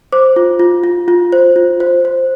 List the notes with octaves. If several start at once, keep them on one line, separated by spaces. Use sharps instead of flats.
C5 D6
F4
F4
F4
F4
C5
F4
C5
C5